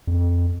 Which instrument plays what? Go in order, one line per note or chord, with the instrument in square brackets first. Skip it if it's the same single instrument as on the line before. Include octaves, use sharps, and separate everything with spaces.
[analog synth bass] F2